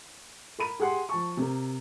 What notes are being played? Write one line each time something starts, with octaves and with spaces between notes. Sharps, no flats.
A#4 B5 D#7
G4 G#4 F#5 C6
F3 A5 C#6
C3 A#4